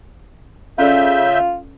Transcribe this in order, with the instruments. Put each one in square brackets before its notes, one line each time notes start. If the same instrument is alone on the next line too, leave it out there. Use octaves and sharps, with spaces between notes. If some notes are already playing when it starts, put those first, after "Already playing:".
[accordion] C#3 E5 G6 [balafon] C#4 A4 D5 [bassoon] F4